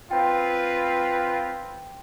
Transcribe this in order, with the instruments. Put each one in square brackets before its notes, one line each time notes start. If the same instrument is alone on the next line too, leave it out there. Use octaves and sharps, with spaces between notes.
[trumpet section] C4 F4 B4 [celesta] G5